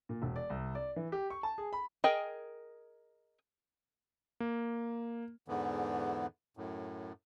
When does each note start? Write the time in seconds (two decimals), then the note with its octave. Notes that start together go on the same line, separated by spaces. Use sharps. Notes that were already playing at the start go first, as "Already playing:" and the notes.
0.09 A#2
0.22 E1
0.36 D5
0.50 C2
0.75 D5
0.96 E3
1.12 G4
1.30 C#6
1.43 A5
1.58 G#4
1.73 B5
2.04 G#4 A#4 D#5 G5
4.40 A#3
5.48 E2 G#2 D3 E3 B3
6.57 F#2 A2